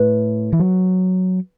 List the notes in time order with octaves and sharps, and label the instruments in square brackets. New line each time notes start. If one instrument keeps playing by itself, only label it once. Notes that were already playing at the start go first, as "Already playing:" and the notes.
Already playing: [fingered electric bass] A2 [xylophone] B4
[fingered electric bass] E3
F#3